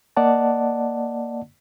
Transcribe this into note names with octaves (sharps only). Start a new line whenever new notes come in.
A#3 D5 D#5 F#5 A5